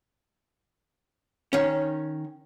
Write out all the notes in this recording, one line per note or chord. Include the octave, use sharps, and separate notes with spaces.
D#3 C#4